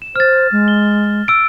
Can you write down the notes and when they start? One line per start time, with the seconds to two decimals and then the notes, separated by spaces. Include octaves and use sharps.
0.02 E7
0.16 C5 F6 A6
0.52 G#3
0.68 G7
1.28 E6 D7